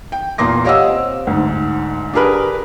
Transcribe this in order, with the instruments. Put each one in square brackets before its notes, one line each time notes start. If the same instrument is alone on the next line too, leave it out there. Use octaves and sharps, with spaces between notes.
[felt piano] G5
E2 A#2 A#3 C6 D6 A#6
G4 C#5 D#5 F5 F#5 E6
C4
D2 G#2
D4 G4 G#4 A#4 B4